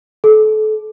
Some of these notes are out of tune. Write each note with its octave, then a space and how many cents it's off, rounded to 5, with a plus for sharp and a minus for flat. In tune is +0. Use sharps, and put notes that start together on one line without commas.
A4 -30